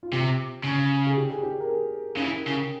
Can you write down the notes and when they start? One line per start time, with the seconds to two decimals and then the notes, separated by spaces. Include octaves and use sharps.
0.03 F4
0.12 C3 G4
0.64 C#3
1.07 G#4
1.17 G4
1.30 G#4
1.43 G4
1.60 A#4
1.69 G#4
2.17 C#3
2.22 E3
2.48 C#3